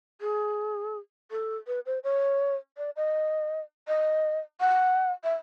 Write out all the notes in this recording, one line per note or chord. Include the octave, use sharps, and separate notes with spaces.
G#4
A4
B4
C5
C#5
D5
D#5
D#5
F#5
E5